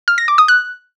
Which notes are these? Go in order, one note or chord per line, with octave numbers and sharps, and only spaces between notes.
F6
A#6
D6
D#6
F#6